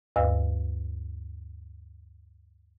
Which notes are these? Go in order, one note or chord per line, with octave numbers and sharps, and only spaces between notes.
D2 G2 B4 F5 E6